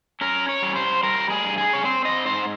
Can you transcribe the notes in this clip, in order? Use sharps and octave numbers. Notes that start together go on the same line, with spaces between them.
C#4 A#4
C#5
G3
C5
G3 A#4
G#4
G2
G#4
C#5
C4 C5
D#5
G#2 C5